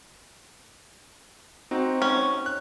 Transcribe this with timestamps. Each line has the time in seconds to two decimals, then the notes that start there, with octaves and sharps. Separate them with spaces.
1.71 C4 D#4 F#4
2.02 C#4
2.46 F#6